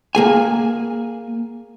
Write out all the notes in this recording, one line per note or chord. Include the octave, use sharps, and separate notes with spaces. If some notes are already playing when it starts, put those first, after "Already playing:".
A#3 G#4 G#5